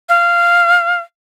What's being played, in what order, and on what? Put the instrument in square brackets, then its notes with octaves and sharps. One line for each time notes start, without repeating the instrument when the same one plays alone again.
[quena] F5